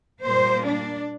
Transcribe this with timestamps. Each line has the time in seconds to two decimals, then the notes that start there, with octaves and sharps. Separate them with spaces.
0.23 A#2 G3 A#3 C5
0.63 D4